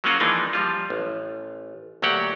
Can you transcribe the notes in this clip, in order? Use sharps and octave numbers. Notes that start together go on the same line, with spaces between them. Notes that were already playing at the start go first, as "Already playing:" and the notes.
F#3 G#3 A#3 C#4 F4 F#4
E3 F3 G#3 A#3 D4 D#4
F3 G3 F4
A1
D2 F#3 A#3 G4 F#5